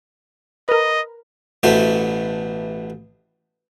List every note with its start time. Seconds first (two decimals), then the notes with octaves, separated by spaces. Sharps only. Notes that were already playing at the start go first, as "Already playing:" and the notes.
0.69 A#4 B4 D#5
1.63 A1 B2 A3 B3 F#4 C5